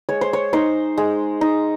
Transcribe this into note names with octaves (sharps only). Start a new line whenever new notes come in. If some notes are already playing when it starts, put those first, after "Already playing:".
G#3 C#5
C5
C#5
D#4 C5
G#3
D#4